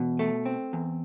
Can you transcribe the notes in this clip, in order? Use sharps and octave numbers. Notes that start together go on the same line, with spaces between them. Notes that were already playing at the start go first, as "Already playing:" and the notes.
Already playing: E2 B2
A3
C4
E2